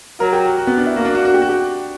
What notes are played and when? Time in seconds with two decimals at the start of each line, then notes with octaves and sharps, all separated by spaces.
0.20 F#3 A#4
0.33 G4
0.46 F#4
0.58 F#4
0.67 B3
0.77 D4
0.86 E4
0.96 A#3 F#4
1.05 D4
1.15 F#4
1.25 F#4
1.34 G4
1.42 F#4
1.49 G4